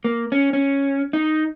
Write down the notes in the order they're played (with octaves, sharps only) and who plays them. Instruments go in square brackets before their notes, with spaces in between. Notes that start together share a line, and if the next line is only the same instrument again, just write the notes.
[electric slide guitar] A#3
C#4
C#4
D#4